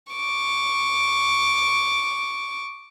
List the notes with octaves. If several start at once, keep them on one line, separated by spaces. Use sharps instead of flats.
C#6 D6